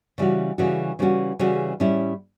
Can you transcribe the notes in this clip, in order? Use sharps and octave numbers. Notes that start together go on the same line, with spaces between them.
C#3 E3 G3 C#4 F#4
C#3 E3 G3 C#4 F#4
C#3 E3 G3 C#4 F#4
C#3 E3 G3 C#4 F#4
A2 G3 C#4 E4